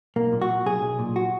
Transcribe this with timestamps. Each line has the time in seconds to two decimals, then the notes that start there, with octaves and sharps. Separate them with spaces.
0.16 B1 A#3
0.32 A#2
0.42 F#4
0.49 F#3
0.66 B1 G#4
0.82 B1
0.99 A#2
1.16 F#4